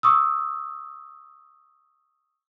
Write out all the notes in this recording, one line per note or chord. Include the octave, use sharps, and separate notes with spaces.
C#6 D#6 E6